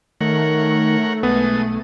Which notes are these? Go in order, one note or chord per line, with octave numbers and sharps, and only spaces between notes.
D#3 A3 A#4 C#5 F#5
B1 G#3 B3 A4 D#6